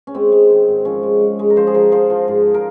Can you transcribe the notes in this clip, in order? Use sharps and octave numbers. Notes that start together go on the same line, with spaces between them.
C#4
G#3 C4
G#3
D#3
G#2
F3 C#4
G#3
G#3
G#3
A#4
F3 C5
G#4
F3 A#4
F3 C5
F3
G#2
A#4